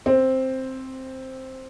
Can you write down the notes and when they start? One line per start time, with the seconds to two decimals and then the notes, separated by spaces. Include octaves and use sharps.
0.06 C4